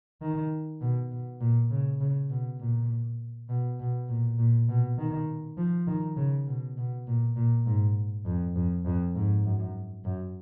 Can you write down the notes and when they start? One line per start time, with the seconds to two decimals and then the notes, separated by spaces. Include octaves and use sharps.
0.22 D#3
0.82 B2
1.12 B2
1.41 A#2
1.71 C#3
2.01 C#3
2.30 B2
2.61 A#2
3.49 B2
3.80 B2
4.09 A#2
4.39 A#2
4.69 B2
4.98 D#3
5.58 F3
5.87 D#3
6.17 C#3
6.47 B2
6.77 B2
7.07 A#2
7.36 A#2
7.66 G#2
8.26 F2
8.56 F2
8.86 F2
9.15 G#2
9.44 F#2
10.05 F#2